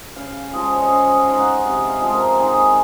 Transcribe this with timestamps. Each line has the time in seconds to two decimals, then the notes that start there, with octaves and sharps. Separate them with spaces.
0.16 C#3 F5
0.53 F3 G#3 D#5
0.73 C#5
0.82 D#5
0.90 C#3 F5
1.15 F5
1.28 G#3 D#4
1.40 F#5
1.65 C3 F5
1.90 F5
2.02 F3 G#3
2.14 A#4
2.39 D#3 G#4